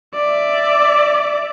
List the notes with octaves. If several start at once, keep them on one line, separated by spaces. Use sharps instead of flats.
D5 E5